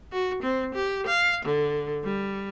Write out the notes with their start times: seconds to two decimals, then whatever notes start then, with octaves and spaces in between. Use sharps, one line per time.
0.12 F#4
0.42 C4
0.74 G4
1.07 F5
1.45 D3
2.04 G3